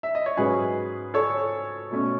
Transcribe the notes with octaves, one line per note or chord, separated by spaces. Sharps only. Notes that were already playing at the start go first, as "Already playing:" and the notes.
E5
D#5
C#5
G#2 F#3 C#4 G#4 B4
A4 C#5
B2 A3 C#4